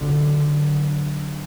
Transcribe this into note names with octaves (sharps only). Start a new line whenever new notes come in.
D3 F#3